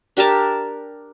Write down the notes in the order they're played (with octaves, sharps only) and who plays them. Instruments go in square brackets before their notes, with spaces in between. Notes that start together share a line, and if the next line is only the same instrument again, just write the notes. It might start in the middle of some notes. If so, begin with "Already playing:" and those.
[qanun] D4 G4 A#4 A5